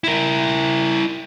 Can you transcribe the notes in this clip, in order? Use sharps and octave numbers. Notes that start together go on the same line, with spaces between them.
E4 A#4